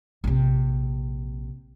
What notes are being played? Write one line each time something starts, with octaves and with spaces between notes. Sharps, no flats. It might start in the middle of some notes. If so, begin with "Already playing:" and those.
A#1 C3